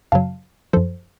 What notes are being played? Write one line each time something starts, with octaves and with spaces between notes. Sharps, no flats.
F#2 C#3 F#3 F5 A5
F#2 F3 A4 C5